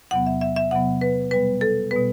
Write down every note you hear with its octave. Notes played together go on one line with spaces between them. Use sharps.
E2 C3 F#3 B3 F#5
E5
E5
E5
E2 C3 F#3 B3 F#5
B4
B2 G3 B3 B4
A4
B2 G3 B3 B4